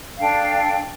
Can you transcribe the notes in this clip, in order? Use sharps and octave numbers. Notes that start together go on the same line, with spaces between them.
D4 A4 F5 G5